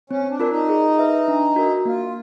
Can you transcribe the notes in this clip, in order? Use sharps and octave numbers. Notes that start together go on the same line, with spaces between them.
C4 C#4
D4
F4 A#4 D5
D#4
G#4
B4 E5
D4
F#4 A#4
A#3 F4